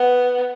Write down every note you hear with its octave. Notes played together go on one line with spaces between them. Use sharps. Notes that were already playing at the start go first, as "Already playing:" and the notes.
Already playing: B3